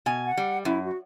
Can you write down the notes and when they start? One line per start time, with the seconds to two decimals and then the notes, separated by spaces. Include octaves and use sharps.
0.06 B2 G#5
0.26 F#5
0.37 G3
0.65 F#2 E4
0.85 F#4